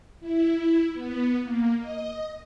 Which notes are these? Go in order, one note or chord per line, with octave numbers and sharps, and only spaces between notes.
E4
B3
A#3
D#5